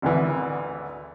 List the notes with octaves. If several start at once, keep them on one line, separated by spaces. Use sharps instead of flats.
G#1 D2 E3